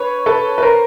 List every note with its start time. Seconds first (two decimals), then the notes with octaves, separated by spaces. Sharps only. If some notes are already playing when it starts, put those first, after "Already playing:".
Already playing: B4 C#5
0.26 A4 B4
0.58 B4
0.62 A#4 C5